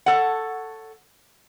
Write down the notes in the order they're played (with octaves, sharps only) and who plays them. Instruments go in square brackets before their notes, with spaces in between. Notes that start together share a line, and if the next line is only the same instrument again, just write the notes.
[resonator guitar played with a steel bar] A4 C#5 F#5